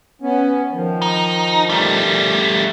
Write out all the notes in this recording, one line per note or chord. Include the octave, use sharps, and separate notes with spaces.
B3 C#4
D#3 F3
D#4
G3 A3